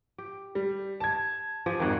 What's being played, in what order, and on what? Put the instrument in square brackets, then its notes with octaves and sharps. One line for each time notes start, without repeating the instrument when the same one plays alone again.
[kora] G4
[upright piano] G3
A5 G#6
[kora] F3 G4 G#4
[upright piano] G#1 F2 [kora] D#3 F#4